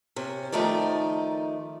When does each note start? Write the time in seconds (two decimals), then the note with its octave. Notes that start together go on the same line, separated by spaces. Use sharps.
0.16 C3 C#4
0.52 D#3 F3 A3 D#4 D5